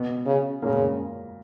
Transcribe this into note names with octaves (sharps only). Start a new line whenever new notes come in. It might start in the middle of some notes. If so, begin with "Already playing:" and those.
Already playing: B2 B3
C#3
A#2 C#3 A#3